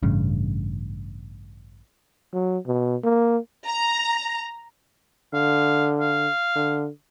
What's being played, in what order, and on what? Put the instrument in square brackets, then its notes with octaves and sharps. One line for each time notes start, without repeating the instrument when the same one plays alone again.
[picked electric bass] A1 G2 C#3
[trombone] F#3
B2
A#3
[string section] A#5
[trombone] D3 [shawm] F5
[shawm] F5
[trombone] D3